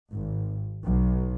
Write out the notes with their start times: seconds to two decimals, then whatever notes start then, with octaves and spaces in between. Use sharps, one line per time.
0.11 G#1
0.84 B1